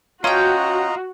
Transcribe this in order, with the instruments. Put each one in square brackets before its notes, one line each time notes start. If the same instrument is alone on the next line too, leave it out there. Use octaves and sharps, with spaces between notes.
[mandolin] C#4 G5 [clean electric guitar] F4 [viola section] F#4 [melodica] D#5 A#5